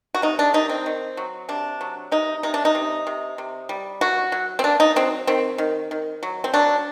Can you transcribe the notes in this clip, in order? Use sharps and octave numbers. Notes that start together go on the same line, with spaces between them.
F#4
C3 D#4
D4
D#3 D#4
C4
D#3
F#3
C3 D4
F#3
C3 D#4
C3 D#4
D4
D#4
C3
C3
C3
G3
F#3 F#4
F#3
C4
A#3 D4
D#4
F#3 C4
D#3 C4
D#3
D#3
F#3
C4
F#3 D4